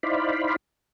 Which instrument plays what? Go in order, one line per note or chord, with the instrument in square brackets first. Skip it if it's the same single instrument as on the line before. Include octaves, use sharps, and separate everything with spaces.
[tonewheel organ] D#4 E4 C5 D5 F5 B5